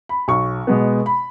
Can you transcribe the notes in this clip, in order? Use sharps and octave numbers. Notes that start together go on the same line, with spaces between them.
B5
B1 C#6
B2 G#3 B3
B5